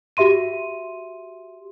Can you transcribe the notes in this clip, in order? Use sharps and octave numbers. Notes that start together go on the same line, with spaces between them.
F#4 G4 E5 C6 D#7